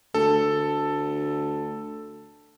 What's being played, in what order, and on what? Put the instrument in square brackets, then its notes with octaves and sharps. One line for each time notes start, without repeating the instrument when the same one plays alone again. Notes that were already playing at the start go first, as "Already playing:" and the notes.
[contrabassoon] D2 [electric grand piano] A4